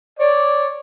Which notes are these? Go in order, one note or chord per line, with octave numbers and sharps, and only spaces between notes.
C#5 D5